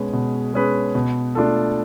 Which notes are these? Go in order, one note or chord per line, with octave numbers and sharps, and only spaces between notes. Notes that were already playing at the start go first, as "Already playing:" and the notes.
Already playing: B2 G#3 C#4 G#4 B4
B2
G#3 C#4 G#4 B4
B2
A3 D4 F4 A4